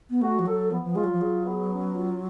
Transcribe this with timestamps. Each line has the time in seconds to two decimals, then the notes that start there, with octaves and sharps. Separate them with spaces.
0.10 B3
0.22 A3 F#4
0.39 F3
0.46 F#3 A4
0.71 F3 B3
0.84 F3
0.95 G#3 F4
1.04 F#3
1.12 F3
1.20 F#3 G#4
1.44 B3
1.69 C#4
1.93 F4